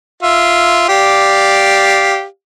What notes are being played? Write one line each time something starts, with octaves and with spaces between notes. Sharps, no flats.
F4 E5
G4 D5 F5